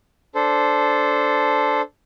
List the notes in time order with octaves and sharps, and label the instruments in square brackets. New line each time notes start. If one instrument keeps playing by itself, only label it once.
[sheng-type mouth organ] D4 A4 C5